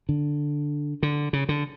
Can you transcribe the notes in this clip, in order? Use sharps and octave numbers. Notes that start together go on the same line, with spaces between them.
D3
D3
C#3
D3